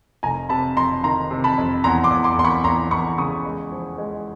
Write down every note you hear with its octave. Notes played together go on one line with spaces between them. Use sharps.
F1 G#5 A#5
C3 A5 B5
F2 A#5 C6
D#3 A#5 C6
C3
A5 B5
F2
E2 A#5 C6
C6 D6
E2
C6 D6
E2 C6
B5 C#6
E2 A#5 C6
E2 B5 C#6
C#3 C#6 D#6
G#3
F3
G#3